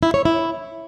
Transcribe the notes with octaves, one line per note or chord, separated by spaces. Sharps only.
E4
C#5
E4